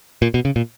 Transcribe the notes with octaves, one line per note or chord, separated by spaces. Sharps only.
A#2
B2
C#3
A#2